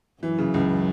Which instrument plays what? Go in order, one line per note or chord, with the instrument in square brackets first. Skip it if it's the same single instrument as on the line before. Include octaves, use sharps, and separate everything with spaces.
[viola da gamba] F#2 F#3 [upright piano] E3
[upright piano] C#3
C#2